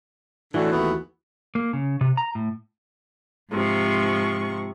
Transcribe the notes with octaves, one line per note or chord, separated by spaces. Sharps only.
A2 D3 E3 F#4
D#2 A3 B3
A#3
C#3
C3
A#5
A2
G#2 C3 F3 C#6